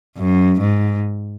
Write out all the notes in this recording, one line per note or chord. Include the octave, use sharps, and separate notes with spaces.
F#2
G#2